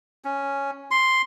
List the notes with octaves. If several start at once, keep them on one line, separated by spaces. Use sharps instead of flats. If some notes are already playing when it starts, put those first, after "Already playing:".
C#4
C6